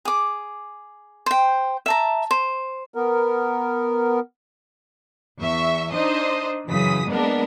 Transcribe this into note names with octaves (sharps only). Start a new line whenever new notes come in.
G#4 D6
C5 G5
E5 A5 A#5
C5
B3 A#4
E2 E5 C#6
D4 D#4 C5 D#5
F#2 C#3 E3 D#6 B6
G#3 A#3 B3 D4 A#4